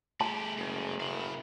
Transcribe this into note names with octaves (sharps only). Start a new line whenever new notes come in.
A3 E4 G4 G#4 A5
F#1 C#3
E4 A#4 F5 B5